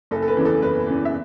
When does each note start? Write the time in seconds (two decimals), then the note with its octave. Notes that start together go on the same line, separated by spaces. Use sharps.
0.11 F#1 A4
0.22 A4
0.28 B4
0.37 E2 C#3 E3
0.45 A4
0.62 F#1 B4
0.87 E2 C#3 E3
1.05 E5